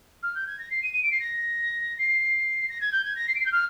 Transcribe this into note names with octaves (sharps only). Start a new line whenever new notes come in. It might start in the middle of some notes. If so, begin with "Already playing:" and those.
F6
G6
G#6
A#6
C7
D#7
D#7
D7
C7
A#6
C7
A#6
G#6
G6
G#6
A#6
C7
D7
C7
G6
F6